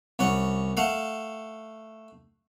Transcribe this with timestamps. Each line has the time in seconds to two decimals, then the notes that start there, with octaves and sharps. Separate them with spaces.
0.19 C2 C#4 F#5
0.77 A3 F5 F#5